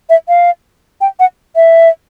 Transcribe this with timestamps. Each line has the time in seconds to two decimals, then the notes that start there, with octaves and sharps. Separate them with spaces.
0.10 E5
0.28 F5
1.01 G5
1.20 F#5
1.56 E5